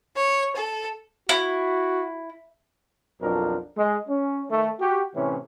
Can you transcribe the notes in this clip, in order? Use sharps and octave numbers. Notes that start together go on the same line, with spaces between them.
C#5
A4
E4 F#4
B1 F2 F3 F#3 D4 A#4
G#3
C#4
D#3 A3
F#4 G4
A2 C3 E3 C#4